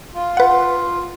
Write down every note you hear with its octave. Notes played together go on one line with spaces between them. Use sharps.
F4
B4 F#5